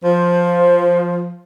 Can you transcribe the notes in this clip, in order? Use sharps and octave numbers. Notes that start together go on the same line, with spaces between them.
F3 C5